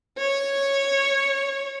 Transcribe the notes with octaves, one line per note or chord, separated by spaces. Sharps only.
C#5